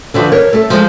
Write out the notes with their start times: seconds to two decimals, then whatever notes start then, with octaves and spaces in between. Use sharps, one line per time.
0.14 D3 E3 F3
0.32 A#4 C#5
0.53 A3 A4
0.70 F3 G#3